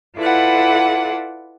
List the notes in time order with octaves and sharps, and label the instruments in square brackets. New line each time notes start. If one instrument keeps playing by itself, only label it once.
[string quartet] E4 F4 A4 B4 D5 F#5